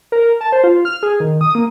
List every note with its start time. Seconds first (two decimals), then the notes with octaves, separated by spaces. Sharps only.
0.12 A#4
0.41 A5
0.52 C5
0.64 F4
0.85 F6
1.03 G#4
1.20 D#3
1.41 D#6
1.55 A#3